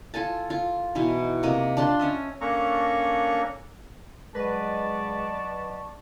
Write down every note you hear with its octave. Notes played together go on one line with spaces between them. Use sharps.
F4 A4 G#5 A5
F4
B2 E3 D#4
C3 A#3 D#5
D4 F4 A5 C6
C#4 D#5 E5
A#3 C#4 D4 A4 A#5 C#6
F#3 G#3 B4 D5 D#5 F#5 A5 C#6